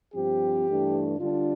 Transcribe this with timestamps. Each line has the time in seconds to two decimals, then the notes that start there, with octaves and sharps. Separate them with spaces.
0.14 G2 F3 C4 G4
0.66 G2 E3 A3 D4
1.19 D3 G3 D4 F4